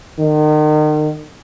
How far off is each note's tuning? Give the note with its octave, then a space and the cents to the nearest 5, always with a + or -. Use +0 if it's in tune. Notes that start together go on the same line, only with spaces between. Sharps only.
D#3 -35